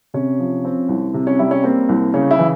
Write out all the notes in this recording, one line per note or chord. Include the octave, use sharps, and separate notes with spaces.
C3 C#4
F3
C4
C2
C3
C#4
G3 E4
C#4
A#3 C4
C2
C#3 C#4
E4
E3